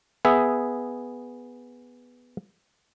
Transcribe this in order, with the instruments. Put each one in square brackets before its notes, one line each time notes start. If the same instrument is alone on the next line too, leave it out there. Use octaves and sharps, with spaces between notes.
[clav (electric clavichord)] B3 G#4 E5